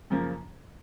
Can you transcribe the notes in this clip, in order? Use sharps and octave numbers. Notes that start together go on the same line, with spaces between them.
F#2 C#3 F3 A#3